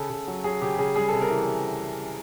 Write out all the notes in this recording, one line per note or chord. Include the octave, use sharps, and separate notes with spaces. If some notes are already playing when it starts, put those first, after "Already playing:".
Already playing: C#3 A4
C#3
F#3
F#3 G#4
C#3 G4
C#3 G#4
G3 G#4
A4
C3
A#4
E3